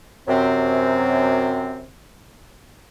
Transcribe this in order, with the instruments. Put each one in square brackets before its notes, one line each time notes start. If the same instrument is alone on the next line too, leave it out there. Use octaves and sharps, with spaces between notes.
[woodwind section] F#2 C3 C4